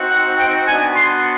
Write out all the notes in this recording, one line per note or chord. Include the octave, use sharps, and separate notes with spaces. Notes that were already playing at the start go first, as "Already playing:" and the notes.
Already playing: C4 D#4 F#4
F#5
G5
B3 D4 F#4 G#5
C6